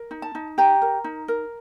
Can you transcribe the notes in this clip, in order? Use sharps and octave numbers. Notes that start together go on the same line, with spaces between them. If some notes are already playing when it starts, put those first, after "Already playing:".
Already playing: A#4
D#4
A5
D#4
G4 A#5
A#4
D#4
A#4